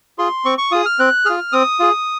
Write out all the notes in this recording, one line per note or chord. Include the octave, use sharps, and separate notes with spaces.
F4 G#4 C6
C4 C#6
C#6
F4 G#4 D#6
F6
C4 F#6
F4 G#4 F6
C4 D#6
F4 G#4